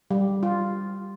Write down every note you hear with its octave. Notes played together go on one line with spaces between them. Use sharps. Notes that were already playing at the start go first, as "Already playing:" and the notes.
G3
F4